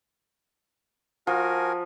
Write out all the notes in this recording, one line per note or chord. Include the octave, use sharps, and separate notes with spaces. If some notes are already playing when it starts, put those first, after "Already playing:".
F3 F#4 A#4 G#5